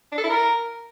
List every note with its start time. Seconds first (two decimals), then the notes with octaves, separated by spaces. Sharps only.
0.12 D4
0.18 A4
0.24 E4
0.29 A#4